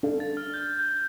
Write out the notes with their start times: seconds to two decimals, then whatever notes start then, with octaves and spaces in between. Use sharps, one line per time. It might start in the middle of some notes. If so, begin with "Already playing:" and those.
0.03 D4 A4 F5
0.20 A6
0.37 F6
0.54 G6
0.79 G6